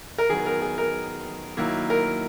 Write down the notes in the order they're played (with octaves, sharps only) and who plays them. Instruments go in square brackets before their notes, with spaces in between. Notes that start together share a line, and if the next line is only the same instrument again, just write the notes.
[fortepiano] A#4
[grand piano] D#3 F#3 B3 [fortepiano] G#4
[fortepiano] A#4
G#4
A#4
[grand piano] D#3 F#3 A#3 E4
[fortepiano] A#4